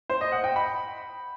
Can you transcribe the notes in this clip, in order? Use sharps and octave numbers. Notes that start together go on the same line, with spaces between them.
C5
D#5
F#5
G5
B5